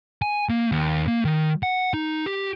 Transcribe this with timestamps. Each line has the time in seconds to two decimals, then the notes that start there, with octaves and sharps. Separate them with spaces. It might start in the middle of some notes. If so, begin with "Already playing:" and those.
0.22 G#5
0.49 A#3
0.72 D#2
1.08 A#3
1.25 D#3
1.63 F#5
1.94 D#4
2.26 G4